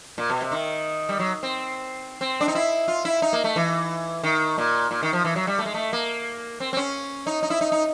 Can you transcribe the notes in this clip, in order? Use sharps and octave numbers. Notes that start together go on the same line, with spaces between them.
A#2
B2
C3
D#3
G3
F#3
C4
C4
D4
D#4
E4
F4
E4
D#4
A#3
A3
E3
D#3
A#2
A#2
D#3
F3
E3
F#3
G3
A3
G#3
A3
A#3
C4
C4
C#4
D#4
D#4
E4
D#4
D#4